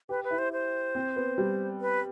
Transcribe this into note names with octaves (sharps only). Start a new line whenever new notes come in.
G4 B4
B4
E4
C5
C5
C4
B3
G3
B4